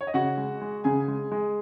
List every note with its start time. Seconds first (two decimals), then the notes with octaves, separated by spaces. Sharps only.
0.01 C#5
0.07 D#5
0.14 C#3 F#4 F#5
0.37 G#3
0.62 G#3
0.84 C#3 G#4 G#5
1.08 G#3
1.32 G#3